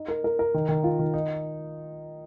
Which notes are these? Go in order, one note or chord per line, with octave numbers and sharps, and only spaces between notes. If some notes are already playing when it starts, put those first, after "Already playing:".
Already playing: D#4
A#4
A#4
A#4
D#3
D#3
F4
D#3
D#4